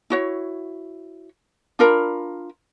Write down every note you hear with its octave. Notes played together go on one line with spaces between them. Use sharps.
E4 F#4 C#5
D4 F4 A#4 B5